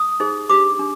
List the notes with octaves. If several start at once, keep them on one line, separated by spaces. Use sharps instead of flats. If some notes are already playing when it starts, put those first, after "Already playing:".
Already playing: D#6
D#4 G#4 C5
D4 G4 C5 D6
D4